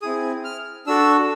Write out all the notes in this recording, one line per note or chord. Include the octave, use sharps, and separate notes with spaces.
C4 E4 G#4 D#6
F6
D4 F#4 A4 E6